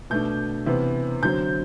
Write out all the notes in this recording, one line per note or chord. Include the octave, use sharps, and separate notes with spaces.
B2 A3 D4 G6
C3 E3 B3
D3 F#3 C4 G6